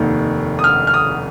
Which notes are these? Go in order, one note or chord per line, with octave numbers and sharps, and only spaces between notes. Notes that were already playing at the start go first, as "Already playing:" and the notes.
Already playing: F1 D#2 D#3
D#6
F6
F6
D#6